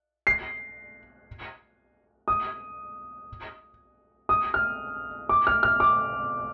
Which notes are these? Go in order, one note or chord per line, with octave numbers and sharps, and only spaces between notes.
C7
D#6
D#6
F6
D6
F6
F6
D6